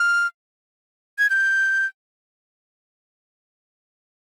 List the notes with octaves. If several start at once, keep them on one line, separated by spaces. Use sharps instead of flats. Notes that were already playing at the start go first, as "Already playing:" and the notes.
Already playing: F6
G#6
G6